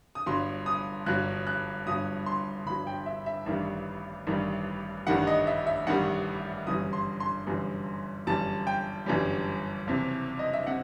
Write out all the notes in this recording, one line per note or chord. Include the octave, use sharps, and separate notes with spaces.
D#6
G1 G2 F#3 C6
D#6
G1 G2 F#3 F#6
F#6
G1 G2 F#3 D#6
C6
G1 G2 F#3 B5
G5
E5
E5
A1 G2 D#3 G3 E5
A1 G2 D#3 G3
A1 G2 D#3 G3 F#5
D#5
E5
E5
A1 G2 D#3 G3 F#5
G1 F#2 E3 G3 D#6
C6
C6
G1 F#2 E3 G3
G1 F#2 E3 G3 A5
G5
G1 F#2 E3 G3
F#1 E2 C3
D#5
E5
C3 F#5